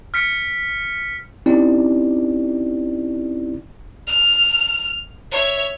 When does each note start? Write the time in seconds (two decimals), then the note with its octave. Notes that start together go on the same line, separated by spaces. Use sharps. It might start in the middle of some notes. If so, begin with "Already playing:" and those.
0.14 F6 B6 C#7
1.46 C4 C#4 D#4 E4 G4 D5
4.07 F6
5.32 C#5 E5